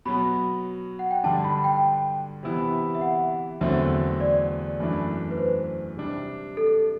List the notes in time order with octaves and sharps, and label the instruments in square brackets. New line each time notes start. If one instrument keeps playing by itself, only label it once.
[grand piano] B2 F#3 B3 [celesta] B5
[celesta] F#5
G5
[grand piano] G2 D3 G3 D4 [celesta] A5
[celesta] B5
G5
[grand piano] C3 E3 B3 E4
[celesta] E5
F#5
[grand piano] E2 D3 F#3 A3 C4 [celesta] E5
[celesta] D5
[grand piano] F#2 E3 A3 D4
[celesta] B4
C5
[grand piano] C3 G3 D4
[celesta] A4